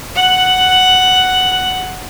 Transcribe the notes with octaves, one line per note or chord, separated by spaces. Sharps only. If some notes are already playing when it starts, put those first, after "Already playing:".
F#5 F#6